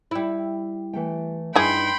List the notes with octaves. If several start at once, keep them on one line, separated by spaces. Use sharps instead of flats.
G3 E4
E3 A3 G5
G2 E3 D#4 G#4 G5 B5 C6